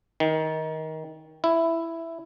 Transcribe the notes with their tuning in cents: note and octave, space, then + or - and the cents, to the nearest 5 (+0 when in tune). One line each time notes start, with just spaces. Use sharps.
D#3 +20
E4 +5